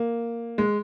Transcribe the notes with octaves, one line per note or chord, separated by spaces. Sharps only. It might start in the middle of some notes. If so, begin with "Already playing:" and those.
Already playing: A#3
G#3